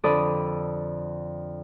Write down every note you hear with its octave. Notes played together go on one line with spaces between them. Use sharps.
F2 D3 A4 D5 B5 D#6